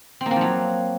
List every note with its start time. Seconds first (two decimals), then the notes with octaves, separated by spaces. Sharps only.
0.21 C4
0.26 A#3
0.31 C4
0.36 F3
0.41 F#3